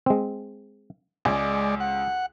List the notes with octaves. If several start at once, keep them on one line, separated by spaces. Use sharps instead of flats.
G#3 C4
C#2 G#3 D5 G#5
F#5